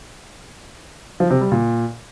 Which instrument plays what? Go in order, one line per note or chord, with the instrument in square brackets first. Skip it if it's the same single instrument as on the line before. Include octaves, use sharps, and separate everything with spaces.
[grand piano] F3
C3
G3
A#2